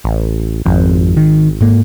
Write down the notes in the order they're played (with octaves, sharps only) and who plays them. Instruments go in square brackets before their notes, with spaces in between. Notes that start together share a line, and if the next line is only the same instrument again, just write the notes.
[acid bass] A1
[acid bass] G#1 [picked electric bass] F2
[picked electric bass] D#3
G#2 A#3